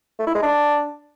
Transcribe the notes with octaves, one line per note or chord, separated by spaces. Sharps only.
A3
E4
G#3
D4